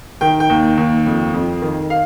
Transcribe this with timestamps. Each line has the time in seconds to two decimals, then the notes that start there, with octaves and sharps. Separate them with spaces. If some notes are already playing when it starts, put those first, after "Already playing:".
0.21 D#3 G5
0.40 G5
0.50 D#2
0.78 D#2
1.06 F2
1.34 F2
1.62 D#3
1.90 F5